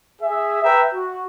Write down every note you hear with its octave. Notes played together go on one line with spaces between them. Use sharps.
G#4 E5
B4 E5 G5 A#5
F#4